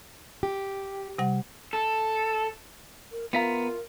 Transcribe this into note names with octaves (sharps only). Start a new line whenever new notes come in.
G4
C3 G3 F#5
A4
A#4
B3 F4 A#4 E5 A#5